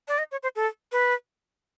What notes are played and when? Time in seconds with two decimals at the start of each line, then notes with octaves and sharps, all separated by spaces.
0.08 D5
0.18 D#5
0.31 C#5
0.43 C5
0.56 A4
0.92 B4